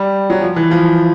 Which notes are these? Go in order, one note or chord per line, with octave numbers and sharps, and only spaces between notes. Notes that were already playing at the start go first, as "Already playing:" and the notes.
Already playing: G3
F#3
F3
E3
F3